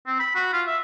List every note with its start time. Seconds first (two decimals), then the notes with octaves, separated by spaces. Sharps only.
0.07 C4
0.20 B5
0.35 F#4
0.53 F4
0.67 E5